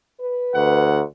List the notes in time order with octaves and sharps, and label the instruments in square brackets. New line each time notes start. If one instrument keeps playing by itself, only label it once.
[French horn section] B4
[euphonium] D2 [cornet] F#5